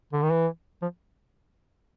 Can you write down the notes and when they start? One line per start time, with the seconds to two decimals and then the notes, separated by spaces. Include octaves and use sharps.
0.13 D3
0.23 D#3
0.32 E3
0.82 F3